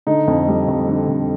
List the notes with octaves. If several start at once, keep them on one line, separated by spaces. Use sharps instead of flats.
D3 D#4
F2
G3
F2
D3
F2